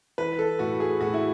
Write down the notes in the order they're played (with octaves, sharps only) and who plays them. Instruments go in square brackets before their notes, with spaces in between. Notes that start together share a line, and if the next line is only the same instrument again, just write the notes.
[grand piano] E3 B4
A4
A2 F#4
G#4
A2 F#4
E4